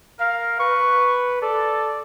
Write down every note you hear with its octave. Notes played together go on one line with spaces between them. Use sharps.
A#4 F5
B4 C#6
A4 D5